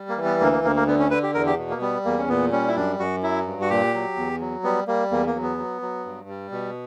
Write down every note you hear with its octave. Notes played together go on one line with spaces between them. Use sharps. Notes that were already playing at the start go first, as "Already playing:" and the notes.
Already playing: G3
A#3
E3
B3
D2 A#3
A#3
D2 A#3
A#3
D3 B3
C#4
D3 B4
G4
E2 A#4
G4
B2
A#3
G3 B3
E2 A#3
C#4
A#2 B3
G3 C#4
E4
F#2 D4
F#2 F#4
F#3 E4
G2
F#4
A#2 G4
F#3
E2
F#3
G3 B3
G3 A#3
E2 A#3
A#3
F#3
B3
F#3
F#3
G2
G3
B2